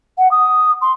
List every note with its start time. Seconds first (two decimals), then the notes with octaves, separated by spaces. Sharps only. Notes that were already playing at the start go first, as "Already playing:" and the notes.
0.18 F#5
0.31 D#6
0.81 C6